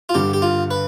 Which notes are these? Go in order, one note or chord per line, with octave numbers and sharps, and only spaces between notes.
F4
G2 D3 G3 G4
G4
F4
B4